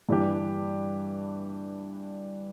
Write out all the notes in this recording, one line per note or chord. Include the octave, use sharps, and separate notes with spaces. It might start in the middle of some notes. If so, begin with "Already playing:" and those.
G2 E3 G3 D4 G4